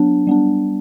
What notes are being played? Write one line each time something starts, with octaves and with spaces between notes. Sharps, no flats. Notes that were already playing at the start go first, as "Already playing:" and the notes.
Already playing: F#3 B3 D4
G3 B3 D4